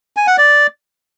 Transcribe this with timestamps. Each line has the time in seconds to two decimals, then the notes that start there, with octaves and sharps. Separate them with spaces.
0.16 G#5
0.27 F#5
0.38 D5